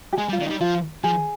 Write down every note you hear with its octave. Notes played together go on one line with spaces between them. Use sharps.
G4
G#3 G#4
G3
F4
D#3 D4
G3 D#4
F3 F4
F3 G#4